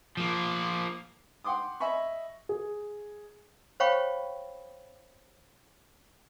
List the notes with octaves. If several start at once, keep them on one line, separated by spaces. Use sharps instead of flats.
F3 A#3
F#5 G5 C6 D6 D#6
D#5 E5 G#5 B5 C#6
G#4
C5 C#5 F5 G5 B5 C#6